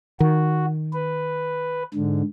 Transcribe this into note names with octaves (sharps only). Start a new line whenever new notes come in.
D#3 F#4
B4
G#2 D3